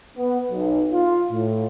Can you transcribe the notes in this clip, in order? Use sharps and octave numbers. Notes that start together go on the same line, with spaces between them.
B3
B1
F4
A2